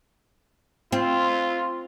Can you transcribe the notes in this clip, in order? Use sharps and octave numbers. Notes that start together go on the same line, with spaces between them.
C4 F4